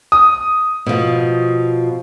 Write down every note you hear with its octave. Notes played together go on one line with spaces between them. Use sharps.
D#6
B2 F3